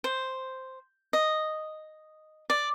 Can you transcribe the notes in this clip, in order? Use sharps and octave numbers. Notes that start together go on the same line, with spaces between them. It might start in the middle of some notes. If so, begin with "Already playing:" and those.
C5
D#5
D5